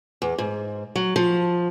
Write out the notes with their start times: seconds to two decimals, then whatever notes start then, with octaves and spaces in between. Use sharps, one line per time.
0.22 E2
0.38 G#2
0.96 F#3
1.16 F3